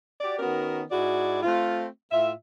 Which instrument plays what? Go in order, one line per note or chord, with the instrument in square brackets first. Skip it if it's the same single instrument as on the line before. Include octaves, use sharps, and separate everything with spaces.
[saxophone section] F#4 G4 D5
D#3 B3 C#4 F#4 A#4
G#2 E4 F#4 G#4 D5
A3 C4 F4
A2 F4 E5